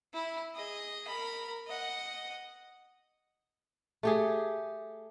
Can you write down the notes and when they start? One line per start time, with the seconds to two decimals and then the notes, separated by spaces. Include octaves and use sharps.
0.13 E4
0.55 G#4 D#5
1.07 A#4 B5
1.67 D#5 F#5
4.03 A3 G4 G#4